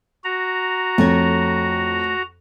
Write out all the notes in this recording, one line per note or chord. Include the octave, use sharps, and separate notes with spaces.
F#4 A#5
F2 A3 C#5